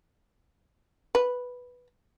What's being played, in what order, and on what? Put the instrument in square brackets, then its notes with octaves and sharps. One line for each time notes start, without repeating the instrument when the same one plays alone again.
[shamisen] B4